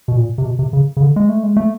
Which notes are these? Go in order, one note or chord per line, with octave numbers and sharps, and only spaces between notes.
B2
A#2
C3
B2
C3
C#3
C#3
D3
G#3
A3
G#3
A3